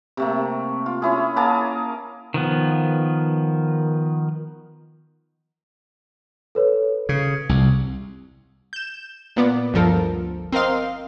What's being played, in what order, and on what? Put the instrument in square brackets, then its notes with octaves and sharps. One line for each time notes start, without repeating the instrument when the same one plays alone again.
[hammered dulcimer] C3 A3 A#3
F4
C#4 E4 G#4
A#3 G#4 A5 A#5
[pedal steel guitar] D#3 F3 B3
[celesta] A4 B4 C#5
[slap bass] C#3 [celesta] G#6
[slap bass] C2
[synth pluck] G6 E7
A#2 B3 D5
G1 D2 F3 A4 A#4
C4 A#4 D#5 F5 C6